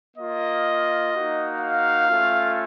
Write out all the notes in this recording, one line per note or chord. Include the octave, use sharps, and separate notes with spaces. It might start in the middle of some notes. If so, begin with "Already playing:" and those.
A#3 F4 D#5
A#3 D#4 F#4
F5
A3 C#4 F4